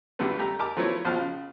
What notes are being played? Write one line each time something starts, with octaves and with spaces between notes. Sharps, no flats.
C#2 D3 F#3 G3 A3 B3
G3 A3 G4 A#5
G4 A#4 G5 A5 D6
F3 F#3 A3 B3 E4 C#5
A#1 B2 F3 A5 F6
C#3